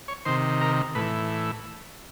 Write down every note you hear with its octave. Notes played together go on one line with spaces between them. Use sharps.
C#5
C3 D#3 C5
A#4
A2 E3 B4